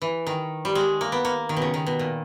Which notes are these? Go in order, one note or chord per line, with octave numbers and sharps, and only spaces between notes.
E3
D#3
G3
G#3
A#3
B3
A#3
D#3
B2
C#3
D#3
B2
A#2